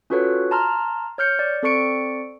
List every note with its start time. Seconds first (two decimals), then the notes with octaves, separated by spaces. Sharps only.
0.10 C#4 F4 F#4 A4 B4 C#5
0.51 A5 A#5 C6 F6
1.18 C#5 F6 G6 C#7
1.39 D5
1.63 C4 A4 D5 C#6 C#7 D7